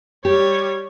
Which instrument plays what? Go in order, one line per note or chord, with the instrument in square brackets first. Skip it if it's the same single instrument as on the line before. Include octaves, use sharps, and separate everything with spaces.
[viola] G3 C#5 [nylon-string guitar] G4